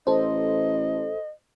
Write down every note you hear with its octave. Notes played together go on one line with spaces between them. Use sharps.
A1 A4 C5 D#5